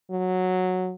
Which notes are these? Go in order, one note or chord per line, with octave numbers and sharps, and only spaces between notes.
F#3